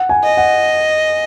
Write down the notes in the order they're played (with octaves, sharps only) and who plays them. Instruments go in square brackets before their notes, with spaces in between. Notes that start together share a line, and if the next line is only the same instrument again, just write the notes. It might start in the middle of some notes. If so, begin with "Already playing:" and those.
Already playing: [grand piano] F#5
G#5
[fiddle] D#5
[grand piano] F#5